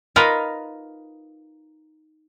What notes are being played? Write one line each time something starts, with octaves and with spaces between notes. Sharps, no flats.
D#4 F4 A#4 B4 D#5 F5